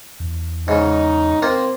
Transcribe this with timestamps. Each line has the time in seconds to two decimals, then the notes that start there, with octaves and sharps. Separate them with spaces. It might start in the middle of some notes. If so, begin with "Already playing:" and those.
0.20 E2
0.68 G#2 C#3 D#4
1.42 A#3 C4 F4